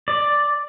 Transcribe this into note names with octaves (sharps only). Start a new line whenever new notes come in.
D5